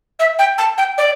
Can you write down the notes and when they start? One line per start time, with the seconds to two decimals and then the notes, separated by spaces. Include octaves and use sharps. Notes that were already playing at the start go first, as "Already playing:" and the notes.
0.19 E5
0.38 G5
0.57 A5
0.77 G5
0.97 D5